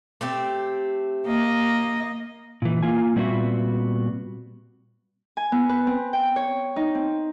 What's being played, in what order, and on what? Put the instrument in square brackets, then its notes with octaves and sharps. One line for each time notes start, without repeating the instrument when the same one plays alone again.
[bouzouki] A3 C4 G4
[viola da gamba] A#3 D#5
[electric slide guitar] A#2 E3
A#3 F4 G#5
A#2 G3 B3 C4 F#4 E5
[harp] G#5
B3
B4
C4
G5
C#5
D#4
C4